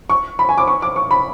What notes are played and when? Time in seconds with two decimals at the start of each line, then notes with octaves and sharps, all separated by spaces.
0.10 C#6
0.39 B5
0.49 G#5
0.58 D6
0.67 C#6
0.82 D6
0.96 C#6
1.11 B5